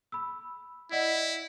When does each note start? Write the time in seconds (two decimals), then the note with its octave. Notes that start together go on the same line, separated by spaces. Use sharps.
0.12 B5 E6
0.92 E4 D5 D#5 F#5